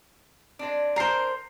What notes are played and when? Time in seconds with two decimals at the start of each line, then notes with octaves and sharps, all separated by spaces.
0.59 G#3 C4 D4
0.96 A#4 C5 A#5 C7